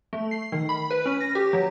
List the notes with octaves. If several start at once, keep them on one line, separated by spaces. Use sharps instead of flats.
A3
C7
D#3
B5
B4
C#4
A#6
G4
F#3